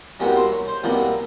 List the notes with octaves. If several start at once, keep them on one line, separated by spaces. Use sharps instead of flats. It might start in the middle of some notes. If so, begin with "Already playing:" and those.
C2 B2 F#3 A#3 C#4 G4
C5
C#5
C5
C2 B2 F#3 A#3 C#4 D5